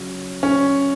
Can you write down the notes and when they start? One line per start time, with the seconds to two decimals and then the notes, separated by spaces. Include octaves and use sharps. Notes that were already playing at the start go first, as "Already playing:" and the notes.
Already playing: C#3 F#3
0.43 C#4